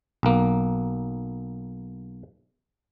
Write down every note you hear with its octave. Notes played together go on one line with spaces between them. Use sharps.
B1 A#3